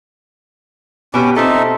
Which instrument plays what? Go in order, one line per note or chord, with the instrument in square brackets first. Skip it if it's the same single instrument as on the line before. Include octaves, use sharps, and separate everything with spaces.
[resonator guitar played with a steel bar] B2 B3 G4 [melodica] C#4 D6
[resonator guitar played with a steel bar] C4 F4 A4 [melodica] D#4 E5